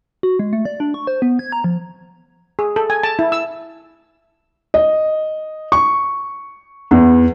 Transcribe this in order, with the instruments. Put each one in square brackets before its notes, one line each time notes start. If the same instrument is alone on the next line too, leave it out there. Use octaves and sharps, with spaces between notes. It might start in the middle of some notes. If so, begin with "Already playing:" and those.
[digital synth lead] F#4
G#3
A3
D5
D4
C#6
C5
B3
G#6
A#5
F3
[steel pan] G#4
A4
G#5
A5
E4
E6
[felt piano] D#5
C#6
E2